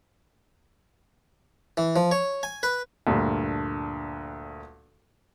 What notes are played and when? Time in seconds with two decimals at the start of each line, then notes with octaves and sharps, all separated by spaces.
1.77 E3
1.96 F3
2.11 C#5
2.43 G#5
2.63 B4
3.07 D2 G2 A#2